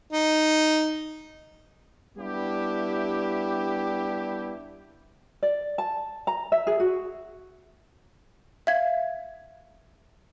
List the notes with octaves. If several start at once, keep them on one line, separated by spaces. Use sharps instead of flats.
D#4
G3 B3 D4 E4 G4
D5
A5
A#5
E5
G#4
F#4
E5 F5 G#6